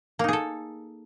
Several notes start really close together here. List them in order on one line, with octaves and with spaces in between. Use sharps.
A#3 D#4 G#4 A4